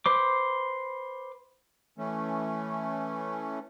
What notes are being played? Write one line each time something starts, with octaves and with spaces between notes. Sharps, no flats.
B4 C5 D6
E3 A3 C#4